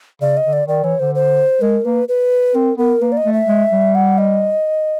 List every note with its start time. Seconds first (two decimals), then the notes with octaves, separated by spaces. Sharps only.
0.21 C#3 D5
0.37 D#5
0.45 D3
0.53 D5
0.68 D#3 D5
0.83 E3 C#5
1.00 D3 C5
1.15 C5
1.62 G#3 A#4
1.84 A#3 B4
2.08 B4
2.55 C4 A#4
2.78 B3 A#4
3.01 A#3 B4
3.12 D5
3.17 D#5
3.25 A3
3.33 E5
3.48 G#3
3.72 G3
3.95 F#5
4.18 D#5